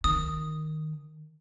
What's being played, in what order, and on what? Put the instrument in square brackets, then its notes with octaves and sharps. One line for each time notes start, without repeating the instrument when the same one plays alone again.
[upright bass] D#3 [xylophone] D#6